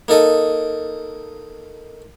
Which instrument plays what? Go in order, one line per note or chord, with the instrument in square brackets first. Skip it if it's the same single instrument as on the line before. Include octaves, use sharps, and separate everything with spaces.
[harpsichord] A#3 D#4 A4 D#5